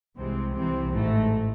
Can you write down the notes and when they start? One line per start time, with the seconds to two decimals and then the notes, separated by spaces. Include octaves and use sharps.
0.16 C2 C3 E3 G#3 C4
0.53 C2 C3 E3 C4
0.90 A1 G#2 E3 A3